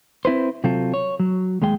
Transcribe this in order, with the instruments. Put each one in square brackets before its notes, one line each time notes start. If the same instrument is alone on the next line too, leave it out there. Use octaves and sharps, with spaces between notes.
[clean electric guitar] C4 E4 B4 C5
C3 F#3 C4 F4 A4
C#5
F#3
D#2 G#3 G#4 G5